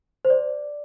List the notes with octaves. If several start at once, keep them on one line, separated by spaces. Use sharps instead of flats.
C5
D5